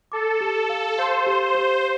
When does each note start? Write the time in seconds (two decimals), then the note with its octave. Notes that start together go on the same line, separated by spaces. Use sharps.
0.12 A4 D6
0.41 G4
0.70 F5
0.98 C5 F5
1.27 G4
1.40 C5
1.55 G4